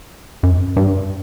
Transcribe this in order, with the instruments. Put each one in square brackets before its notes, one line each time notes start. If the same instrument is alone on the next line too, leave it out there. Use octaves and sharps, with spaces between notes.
[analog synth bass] F#2
G2